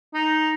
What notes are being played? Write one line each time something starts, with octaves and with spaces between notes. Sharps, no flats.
D#4